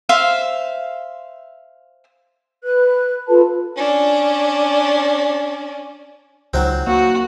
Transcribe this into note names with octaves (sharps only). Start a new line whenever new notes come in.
C5 E5 F5
B4 F#6
F4 A4 B4 A5
C#4 D4
C#2 D#3 F#3 C4
A#3 F#4